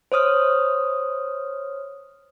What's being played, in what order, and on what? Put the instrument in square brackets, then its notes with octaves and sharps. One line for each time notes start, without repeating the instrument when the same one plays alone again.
[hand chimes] C5 C#5 D#6 F6